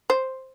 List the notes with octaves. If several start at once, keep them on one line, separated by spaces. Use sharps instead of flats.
C5